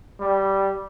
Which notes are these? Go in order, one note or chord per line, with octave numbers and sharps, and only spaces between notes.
G3